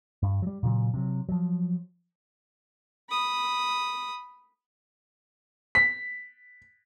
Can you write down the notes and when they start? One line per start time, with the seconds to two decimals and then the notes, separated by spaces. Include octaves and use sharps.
0.23 G2
0.42 F#3 G3
0.63 A#2 C#3 E3 F#3
0.94 C3 F#3
1.29 F3 F#3
3.10 B5 D#6
5.75 B6